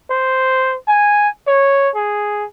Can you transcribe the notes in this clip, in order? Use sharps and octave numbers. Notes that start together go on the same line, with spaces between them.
C5
G#5
C#5
G#4